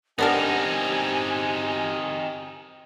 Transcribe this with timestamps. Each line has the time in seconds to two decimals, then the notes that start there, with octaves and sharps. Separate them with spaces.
0.19 B3 C4 D4 D#4 G4 A#4 G#5